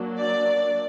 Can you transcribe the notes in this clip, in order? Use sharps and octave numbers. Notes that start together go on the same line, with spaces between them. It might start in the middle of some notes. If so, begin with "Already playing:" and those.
Already playing: F#3 A#3 D4
D5